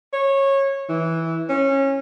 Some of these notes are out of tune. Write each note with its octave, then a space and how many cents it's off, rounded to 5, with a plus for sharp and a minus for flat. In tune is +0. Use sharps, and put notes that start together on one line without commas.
C#5 -20
E3 -10
C#4 -20